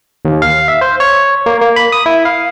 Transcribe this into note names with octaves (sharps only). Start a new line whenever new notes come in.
D#2
F5
E5
C5
C#5
A#3
A#3
B5
D#6
E4
F5